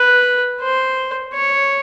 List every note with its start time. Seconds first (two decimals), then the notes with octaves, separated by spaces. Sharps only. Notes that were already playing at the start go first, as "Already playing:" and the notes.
Already playing: B4
0.61 C5
1.34 C#5